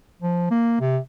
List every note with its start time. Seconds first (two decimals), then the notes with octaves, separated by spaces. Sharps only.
0.22 F3
0.51 A#3
0.80 C3